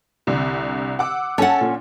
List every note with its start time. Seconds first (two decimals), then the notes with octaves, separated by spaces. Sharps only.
0.27 C2 D3
0.99 F#5 D6 E6
1.38 C#4 A4 F#5
1.61 A#2